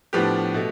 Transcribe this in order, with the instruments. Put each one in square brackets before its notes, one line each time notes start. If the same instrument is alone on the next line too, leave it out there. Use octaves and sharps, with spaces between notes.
[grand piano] A2 F3 B3 D4 G4 B4
B2 A3